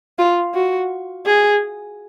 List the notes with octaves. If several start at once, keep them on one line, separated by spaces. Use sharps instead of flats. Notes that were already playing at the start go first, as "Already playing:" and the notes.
F4
F#4
G#4